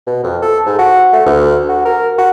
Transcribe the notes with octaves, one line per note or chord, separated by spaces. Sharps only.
B2
F2
A4
G#2
F#4
A3
D2
F#4
A#4
F#4